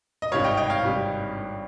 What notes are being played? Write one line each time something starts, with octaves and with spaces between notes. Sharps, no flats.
D#5
G#1 G2 G3 C#5 F5
D#5 G5
D#5 G5
C#5 F5
G#1 G2 G3